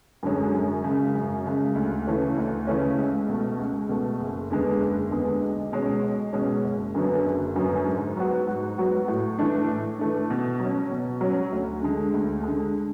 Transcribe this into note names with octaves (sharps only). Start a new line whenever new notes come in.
F#2 D3 G#3 C#4
F#2
C#3 G#3
F#2
C#3 G#3
D2
C#3 E3 A3 C#4
D2
C#3 E3 A3 C#4
C#2
B2 A3
C#2
B2 A3
F#1
E2 D3 G#3 B3
F#1
E2 D3 G#3 B3
B1
B2 G#3 C#4
B1
B2 G#3 C#4
F#1
F#2 D3 F#3 B3
F#1
F#2 D3 F#3 B3
G#2
F#3 B3 F#4
G#2
F#3 B3 F#4
A2
E3 A3 D4
A2
E3 A3 D4
B2
F#3
C#4
B2
F#3 C#4
D2
D3 G#3
D2
D3 G#3